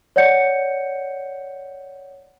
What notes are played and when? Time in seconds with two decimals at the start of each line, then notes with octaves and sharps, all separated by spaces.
0.16 C#5 D5 F#5 G6 C#7